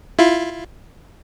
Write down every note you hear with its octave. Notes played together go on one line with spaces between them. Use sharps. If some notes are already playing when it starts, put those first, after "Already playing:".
E4 F4